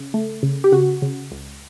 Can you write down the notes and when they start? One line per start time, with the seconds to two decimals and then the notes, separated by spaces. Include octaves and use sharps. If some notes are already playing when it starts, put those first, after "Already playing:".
Already playing: C#3
0.14 A3
0.43 C#3
0.64 G4
0.72 C#3 F#4
1.02 C#3
1.31 C#2